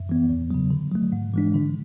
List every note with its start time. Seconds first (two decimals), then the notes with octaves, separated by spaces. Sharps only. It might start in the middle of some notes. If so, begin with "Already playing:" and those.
Already playing: F#2
0.09 E3 B3
0.29 E2
0.51 C#3 F#3
0.70 D3
0.92 F#3 A3
1.12 G#2
1.34 E3 G#3 D4
1.54 D3